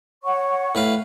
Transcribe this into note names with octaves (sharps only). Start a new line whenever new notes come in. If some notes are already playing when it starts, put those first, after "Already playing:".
C#5 F#5 C#6
A2 B4 F5